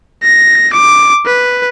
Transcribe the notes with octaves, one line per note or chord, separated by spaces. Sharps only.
A#6
D6
B4